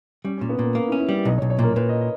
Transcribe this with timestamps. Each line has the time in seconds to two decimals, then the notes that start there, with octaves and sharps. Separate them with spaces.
0.24 G3 C#4
0.38 C#4
0.41 A#2
0.49 B3
0.59 A#2 A#3
0.75 A#3 C#4
0.88 E4
0.92 C#4
1.00 E4
1.09 G3 G4
1.25 B1 D#5
1.38 C#5
1.42 B1
1.50 C#5
1.59 A#2 A#4
1.76 A#2 B4
1.89 D#5
2.01 D#5